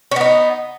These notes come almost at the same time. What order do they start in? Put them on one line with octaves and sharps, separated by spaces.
C#4 B3 D#4